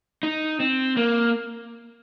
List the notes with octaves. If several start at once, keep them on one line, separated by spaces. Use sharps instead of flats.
D#4
C4
A#3